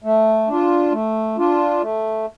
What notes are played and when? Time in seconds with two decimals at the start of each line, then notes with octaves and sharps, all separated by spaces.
0.04 A3
0.48 D4 F4
0.92 A3
1.38 D4 F4
1.81 A3